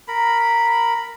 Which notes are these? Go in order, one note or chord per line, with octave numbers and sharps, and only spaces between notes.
A#4 B5